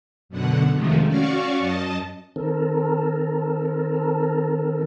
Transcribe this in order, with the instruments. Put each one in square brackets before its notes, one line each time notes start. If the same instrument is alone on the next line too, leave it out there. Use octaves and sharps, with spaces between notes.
[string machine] F#2 B2 D3 F#5
F2 C3 D#3 F3 G#3 A3
C#4 F#4 D5 F5 C#6
F#2 D#5 A5
[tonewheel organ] D#3 C4 A4 A#4